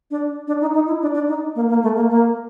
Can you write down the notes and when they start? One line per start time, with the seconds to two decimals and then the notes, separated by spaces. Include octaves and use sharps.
0.11 D4
0.47 D4
0.61 D#4
0.74 D#4
0.87 E4
1.01 D4
1.14 D4
1.28 D#4
1.56 A#3
1.69 A#3
1.83 A3
1.96 A#3
2.09 A#3